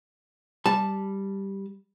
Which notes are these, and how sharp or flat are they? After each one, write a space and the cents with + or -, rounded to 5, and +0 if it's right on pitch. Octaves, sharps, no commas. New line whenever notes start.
G3 +0 A5 -5